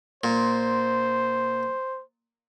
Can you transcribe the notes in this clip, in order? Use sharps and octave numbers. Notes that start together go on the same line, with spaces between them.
A#2 C5